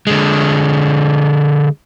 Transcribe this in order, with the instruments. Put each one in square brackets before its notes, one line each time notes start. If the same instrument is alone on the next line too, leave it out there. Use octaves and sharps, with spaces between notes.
[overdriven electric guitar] D3 G#3